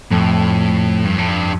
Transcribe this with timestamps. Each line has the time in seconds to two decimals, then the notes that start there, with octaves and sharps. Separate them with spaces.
0.11 F2 A2
1.05 G2
1.18 A2
1.28 G2